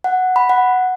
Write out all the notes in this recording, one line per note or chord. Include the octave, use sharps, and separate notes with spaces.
F#5
B5
F#5